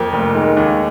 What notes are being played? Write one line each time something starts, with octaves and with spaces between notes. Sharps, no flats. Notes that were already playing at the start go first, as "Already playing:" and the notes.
Already playing: F2 A#3
F1
D#3 G#3
D#2